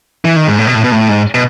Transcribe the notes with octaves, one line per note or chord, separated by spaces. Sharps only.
E3
D#3
G#2
A2
B2
A2
B2
A2
G#2
B2